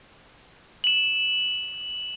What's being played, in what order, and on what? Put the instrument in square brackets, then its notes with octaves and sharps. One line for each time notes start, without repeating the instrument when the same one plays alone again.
[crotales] E7 F#7